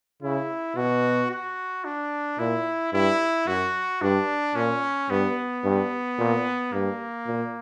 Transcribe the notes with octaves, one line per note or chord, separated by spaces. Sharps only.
C#3 E4
B2 F#4
F#4
D4
A#2 E4
G2 E4
F#2 F#4
G2 D4
A#2 C#4
G2 B3
G2
A#2
G2 A#3
A#2